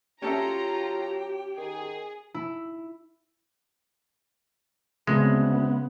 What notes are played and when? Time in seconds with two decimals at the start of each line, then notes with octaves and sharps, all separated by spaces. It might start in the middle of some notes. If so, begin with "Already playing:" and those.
0.22 F#3 C#4 F4 G4 A4 E5 A#5
1.57 D#3 G#4
2.34 E4
5.07 D2 C#3 G#3 B3 C4